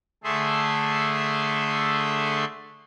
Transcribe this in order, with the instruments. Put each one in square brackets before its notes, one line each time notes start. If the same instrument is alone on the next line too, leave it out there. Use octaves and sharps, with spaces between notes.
[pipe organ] D3 A3 G#4 A4 E5 C6